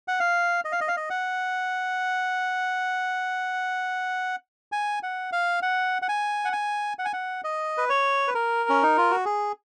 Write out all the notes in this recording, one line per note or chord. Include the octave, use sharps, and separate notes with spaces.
F#5
F5
D#5
F5
D#5
F5
D#5
F#5
G#5
F#5
F5
F#5
F#5
G#5
F#5
G#5
F#5
G#5
F#5
D#5
B4
C#5
B4
A#4
C#4
D#4
F4
F#4
G#4